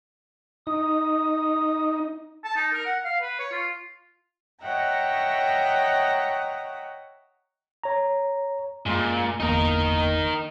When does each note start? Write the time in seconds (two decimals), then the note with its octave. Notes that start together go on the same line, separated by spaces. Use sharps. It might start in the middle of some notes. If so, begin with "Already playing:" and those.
0.67 D#4 D#6
2.44 A5
2.56 D#4
2.73 A#4
2.86 F#5
3.04 F5
3.21 B4
3.39 C#5
3.52 F4
4.62 C#5 D#5 E5 F#5 G5 A#5
7.83 C#5 A#5
8.86 F#2 A#2 G#3 C6
9.40 G1 E2 A#3 D#4 A#4